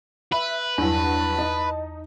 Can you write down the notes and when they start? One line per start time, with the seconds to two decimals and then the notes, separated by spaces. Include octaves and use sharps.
0.32 B4 E5
0.78 E2 G2 F#3 E4 A5
1.38 D#4 D#5